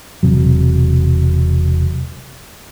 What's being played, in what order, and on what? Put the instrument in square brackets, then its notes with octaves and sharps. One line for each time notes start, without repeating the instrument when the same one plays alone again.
[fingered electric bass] E1 C3 F#3